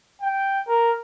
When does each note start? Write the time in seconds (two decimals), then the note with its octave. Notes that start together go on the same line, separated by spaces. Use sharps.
0.22 G5
0.68 A#4